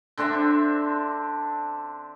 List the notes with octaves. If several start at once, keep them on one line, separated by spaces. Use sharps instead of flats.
D3 C4 D4 E5